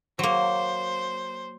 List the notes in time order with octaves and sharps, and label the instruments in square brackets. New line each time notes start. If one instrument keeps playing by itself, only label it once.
[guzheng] F#3 A#3 [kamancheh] C5